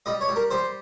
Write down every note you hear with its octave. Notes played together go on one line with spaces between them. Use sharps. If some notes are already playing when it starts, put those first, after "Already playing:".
G3 D#5
C#5
G3
A#4
G3 C5